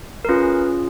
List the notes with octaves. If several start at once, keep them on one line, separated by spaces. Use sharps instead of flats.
A#4
C#4 F4 G#4 B4